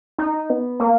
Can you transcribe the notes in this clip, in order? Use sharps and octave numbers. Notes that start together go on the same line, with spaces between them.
D#4
B3
A#3